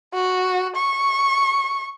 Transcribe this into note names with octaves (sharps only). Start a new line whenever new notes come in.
F#4
C#6